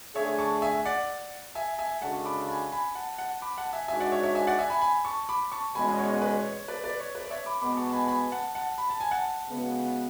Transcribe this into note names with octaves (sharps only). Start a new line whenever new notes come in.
D3 A3 D4 G#4 C#5 E5
A5 C#6
E5 G#5
D5 F#5
E5 G#5
E5 G#5
C#3 G#3 D4 F#4 A4 F#5 A5
B5 D6
G#5 B5
G#5 B5
F#5 A5
F#5 A5
B5 D6
F#5 A5
E5 G#5
G#2 G#3 D4 F#4 E5 G#5
D5 F#5
C#5 E5
C#5 E5
E5 G#5
D5 F#5
E5 G#5
G#5 B5
G#5 B5
A5 C#6
B5 D6
A5 C#6
E2 B2 G#3 C#4 G#5 B5
C#5
B4
C#5
C#5
B4 D5
B4 D5
C#5
B4 D5
D5
C#5 E5
B5 D6
B2 G#3 B3 B5 D6
A5 C#6
A5
G#5 B5
G#5 B5
F#5 A5
F#5 A5
B5
A5
G#5
F#5 A5
C#3 G#3 B3 F#4